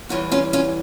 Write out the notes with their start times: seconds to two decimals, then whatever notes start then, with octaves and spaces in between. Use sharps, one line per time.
0.09 E2 E3 G3 C#4 F4
0.31 C#4 F4
0.53 C#4 F4